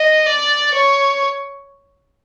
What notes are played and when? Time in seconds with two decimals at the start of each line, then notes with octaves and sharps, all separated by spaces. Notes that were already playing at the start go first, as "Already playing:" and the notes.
Already playing: D#5
0.26 D5
0.74 C#5